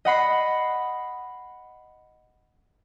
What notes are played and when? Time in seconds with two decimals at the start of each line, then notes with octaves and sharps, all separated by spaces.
0.05 D#5 F#5 B5 C7